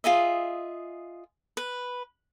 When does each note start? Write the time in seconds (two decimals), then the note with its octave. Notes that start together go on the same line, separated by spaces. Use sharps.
0.04 F4 G#4 D#5 E5
1.57 B4